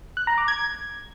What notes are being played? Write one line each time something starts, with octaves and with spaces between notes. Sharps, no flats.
F#6
A#5
D6
G#6